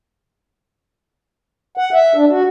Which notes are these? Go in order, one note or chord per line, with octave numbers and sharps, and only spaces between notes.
F#5
E5
D4
F#4